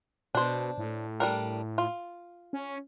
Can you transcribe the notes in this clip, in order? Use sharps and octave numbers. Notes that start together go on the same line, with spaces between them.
B2 D4 C5
A2
G3 D4 A#4
F4
C#4